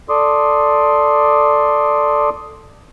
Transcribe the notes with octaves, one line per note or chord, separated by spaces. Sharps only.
A4 D5 C6 D6 D#6